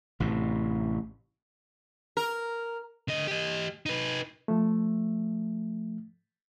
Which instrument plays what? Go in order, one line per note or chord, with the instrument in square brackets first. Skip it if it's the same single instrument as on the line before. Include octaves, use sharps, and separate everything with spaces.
[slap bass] A1 A2 C3
[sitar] A#4
[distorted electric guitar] D3 D#5
G4 D#5
D#4 B4
[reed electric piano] F3 A3